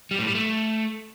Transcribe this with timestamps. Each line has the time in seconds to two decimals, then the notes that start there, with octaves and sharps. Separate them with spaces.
0.11 G3
0.19 A2
0.27 G3
0.35 A3